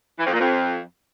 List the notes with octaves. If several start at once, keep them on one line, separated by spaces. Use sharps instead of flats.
E3
F2
A#2
F2